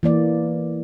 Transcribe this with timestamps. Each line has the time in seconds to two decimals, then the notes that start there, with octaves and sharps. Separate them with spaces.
0.03 E3 A#3 D5